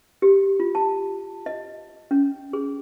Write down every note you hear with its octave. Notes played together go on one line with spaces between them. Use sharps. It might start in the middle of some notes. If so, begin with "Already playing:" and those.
G4
F4
A5
D#5
C#4
G#4